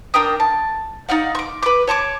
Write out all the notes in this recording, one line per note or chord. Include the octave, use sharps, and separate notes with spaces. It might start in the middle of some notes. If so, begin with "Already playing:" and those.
D4 A#4 G5 D#6
A5
D#4 D5 F5 F#5
C#6 D6
B4 D6
C#5 A5 C#6 D6